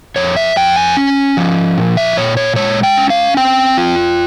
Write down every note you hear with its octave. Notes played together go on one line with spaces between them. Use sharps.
F2 C#5
E5
F2 G5
G#5
C#4
F3
A#2
E5
A#2 C#5
C#5
G#3 C#5
G5
C#4
F5
C4 G5
F4